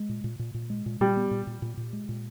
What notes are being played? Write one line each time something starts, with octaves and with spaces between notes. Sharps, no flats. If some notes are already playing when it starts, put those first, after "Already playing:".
Already playing: G#3
A#2
A#2
A#2
A#2
G#3
A#2
A#2 G3
B3
A#2
A#2
A#2
A#2
G#3
A#2